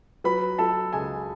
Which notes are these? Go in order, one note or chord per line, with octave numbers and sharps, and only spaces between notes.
F#3 B4 B5
F#3 A4 A5
C#2 G#4 G#5